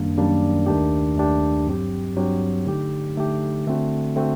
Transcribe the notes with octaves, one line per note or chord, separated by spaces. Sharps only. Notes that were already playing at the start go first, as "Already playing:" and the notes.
Already playing: F#2 D#3 G3 A#3 D4
F#2 D#3 G3 A#3 D4
D#2 D#3 A3 D4 G4
D#2 D#3 A3 D4 G4
G2 F#3 C4 G4
G2 F#3 C4 G4
D3 A3 D#4 G4
D3 A3 D#4 G4
D3 A3 C4 F#4
D3 A3 C4 F#4